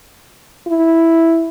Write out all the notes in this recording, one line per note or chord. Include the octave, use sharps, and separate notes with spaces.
E4